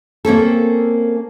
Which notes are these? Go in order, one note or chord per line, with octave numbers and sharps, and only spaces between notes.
A#3 C4 C#4 A4